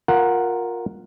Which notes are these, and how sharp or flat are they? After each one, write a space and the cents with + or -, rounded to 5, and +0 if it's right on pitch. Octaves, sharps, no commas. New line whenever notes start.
F4 +20 A#4 +0 F#5 +0